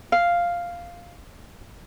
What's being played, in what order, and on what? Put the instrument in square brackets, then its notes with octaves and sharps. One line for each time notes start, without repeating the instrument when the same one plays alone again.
[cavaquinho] F5